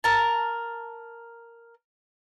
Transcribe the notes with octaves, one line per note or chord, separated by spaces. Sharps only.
A#4 A5